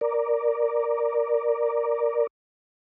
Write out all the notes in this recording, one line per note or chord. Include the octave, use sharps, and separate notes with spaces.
A#4 D5